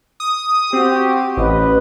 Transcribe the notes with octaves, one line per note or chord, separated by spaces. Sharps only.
D#6
C4 F#4 G4
A1 B4 D#5